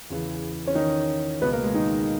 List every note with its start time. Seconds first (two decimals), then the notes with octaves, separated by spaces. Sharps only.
0.10 E2 C#3 E3
0.67 C#4
0.75 D#3 D#4
1.41 C#2 B2 B3 B4
1.52 A#3 A#4
1.64 G#3 G#4
1.74 D#3 D#4